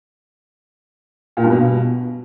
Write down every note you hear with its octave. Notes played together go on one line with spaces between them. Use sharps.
A#2
G2
B2